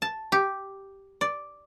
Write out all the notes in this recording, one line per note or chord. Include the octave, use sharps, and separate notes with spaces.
A5
G4
D5